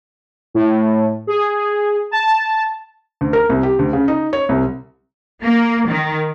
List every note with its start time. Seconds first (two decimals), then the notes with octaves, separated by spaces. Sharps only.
0.54 A2
1.27 G#4
2.11 A5
3.21 D2
3.33 A#4
3.50 C2
3.63 G4
3.79 D2
3.93 C#3
4.08 D#4
4.33 C#5
4.49 C2
5.42 A#3
5.87 D#3